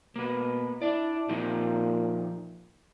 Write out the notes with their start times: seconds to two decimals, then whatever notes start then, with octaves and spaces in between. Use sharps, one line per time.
0.16 B2 A#3 B4
0.82 D4 E4 D5
1.29 A#2 F3 D#4 G4